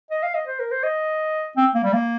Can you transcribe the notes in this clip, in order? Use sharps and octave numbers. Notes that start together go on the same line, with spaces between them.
D#5
F5
D#5
C5
A#4
C5
D#5
C4
A#3
G3
A#3